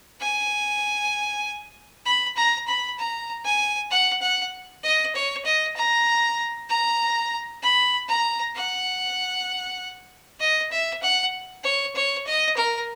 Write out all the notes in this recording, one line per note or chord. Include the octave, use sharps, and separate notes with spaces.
G#5
B5
A#5
B5
A#5
G#5
F#5
F#5
D#5
C#5
D#5
A#5
A#5
B5
A#5
F#5
D#5
E5
F#5
C#5
C#5
D#5
A#4